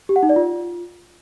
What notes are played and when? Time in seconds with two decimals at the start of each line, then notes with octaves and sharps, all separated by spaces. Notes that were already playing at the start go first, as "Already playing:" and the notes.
0.09 G4
0.16 F#5
0.23 D#4
0.29 D5
0.36 F4